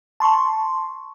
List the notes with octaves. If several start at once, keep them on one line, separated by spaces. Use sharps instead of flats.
A5 C6 C#6